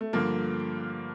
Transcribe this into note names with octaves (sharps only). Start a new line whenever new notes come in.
A3
G2 D3 F3 A#3